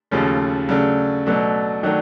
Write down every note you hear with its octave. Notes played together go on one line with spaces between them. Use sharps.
D#2 C#3 F3 A3 C#4
C#3 F#3 A3 D4
B2 F#3 A3 D4
D#3 F#3 A3 D4